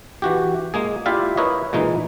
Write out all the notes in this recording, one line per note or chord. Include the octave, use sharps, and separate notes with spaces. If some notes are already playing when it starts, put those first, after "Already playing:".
E3 F#4 G4
G#3 A#3 G#4
E4 F4 G4 D5 E5 F5
E4 A#4 B4 C#5 D#5
A#2 E3 G#3 D#4